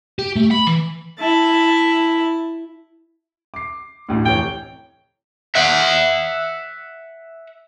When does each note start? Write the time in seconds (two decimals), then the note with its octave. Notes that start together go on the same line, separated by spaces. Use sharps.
0.19 G4
0.36 A3
0.51 B5
0.67 E3
1.20 E4 A5
3.54 D6 C7
4.09 A1 D2 A2
4.25 F1 E3 C#5 G5
5.55 E5 F#5